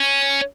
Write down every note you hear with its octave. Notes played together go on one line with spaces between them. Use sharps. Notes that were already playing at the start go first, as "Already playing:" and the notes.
Already playing: C#4